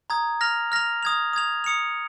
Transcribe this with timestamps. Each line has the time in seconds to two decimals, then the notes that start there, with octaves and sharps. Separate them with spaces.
0.10 A#5 D#6 G#6
0.41 F6 A#6 F7
0.72 F6 A#6 F7
1.03 D#6 G#6 F7
1.33 D#6 G#6 F7
1.64 D#6 C#7 F7